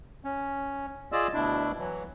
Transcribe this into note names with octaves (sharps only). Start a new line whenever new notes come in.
C#4
F4 G#4 D5 D#5 E6
D2 B2 D4 E4
E3 F#3